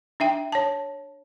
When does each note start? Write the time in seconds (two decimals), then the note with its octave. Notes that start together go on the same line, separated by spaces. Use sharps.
0.20 D4 E5 G5
0.52 C#5 A5